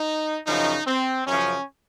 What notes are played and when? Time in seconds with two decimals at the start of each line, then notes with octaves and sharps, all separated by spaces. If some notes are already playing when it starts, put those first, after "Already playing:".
Already playing: D#4
0.47 F#2 C#3 F3 D#4
0.87 C4
1.27 F#2 C#3 F3 C#4